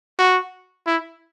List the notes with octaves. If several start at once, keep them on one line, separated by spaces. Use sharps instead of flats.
F#4
E4